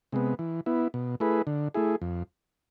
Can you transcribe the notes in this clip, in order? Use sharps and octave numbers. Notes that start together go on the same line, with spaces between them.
C3 G#3 B3
E3
B3 E4
B2
A3 E4 G#4 B4
D3
A3 E4 G#4
F2